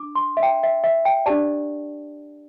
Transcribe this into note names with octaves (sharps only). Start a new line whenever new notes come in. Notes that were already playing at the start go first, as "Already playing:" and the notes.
Already playing: D4 D6
C6
E5
G5
E5
E5
G5
D4 G4 D5 A5